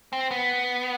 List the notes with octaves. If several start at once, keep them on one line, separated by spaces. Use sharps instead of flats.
C4
B3